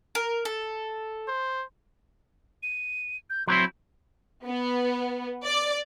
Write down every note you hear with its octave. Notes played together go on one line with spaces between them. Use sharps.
A#4
A4
C5
D#7
G6
F#3 C4 E4 C6
B3
D5